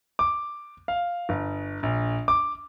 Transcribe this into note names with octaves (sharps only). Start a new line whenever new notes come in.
D6
F5
G1
A#1
D6